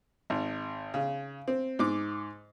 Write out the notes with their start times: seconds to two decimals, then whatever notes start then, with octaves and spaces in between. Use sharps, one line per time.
0.30 G#1
0.94 C#3
1.48 C4
1.79 G#2 D6